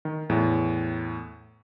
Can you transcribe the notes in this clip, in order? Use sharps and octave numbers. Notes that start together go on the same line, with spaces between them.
D#3
E2 A2